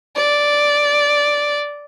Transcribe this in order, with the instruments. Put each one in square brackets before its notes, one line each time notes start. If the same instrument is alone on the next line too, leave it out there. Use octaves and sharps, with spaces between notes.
[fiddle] D5